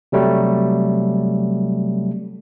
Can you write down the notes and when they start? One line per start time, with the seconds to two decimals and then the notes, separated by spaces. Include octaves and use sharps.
0.12 C3 F#3 G3 A3